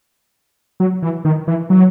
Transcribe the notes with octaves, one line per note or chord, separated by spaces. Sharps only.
F#3
E3
D#3
E3
F#3